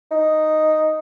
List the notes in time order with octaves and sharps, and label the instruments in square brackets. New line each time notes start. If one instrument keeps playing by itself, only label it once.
[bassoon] D#4